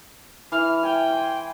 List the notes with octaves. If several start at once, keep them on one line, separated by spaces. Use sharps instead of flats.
E3 F6
G5 G#5
C6